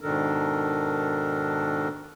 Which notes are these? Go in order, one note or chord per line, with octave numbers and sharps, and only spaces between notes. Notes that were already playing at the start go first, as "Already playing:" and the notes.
G#2 B2 D#3 D4 A4 A#4